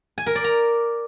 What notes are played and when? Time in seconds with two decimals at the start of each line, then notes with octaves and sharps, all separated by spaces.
0.18 G#5
0.27 A#4
0.35 D5
0.44 A#5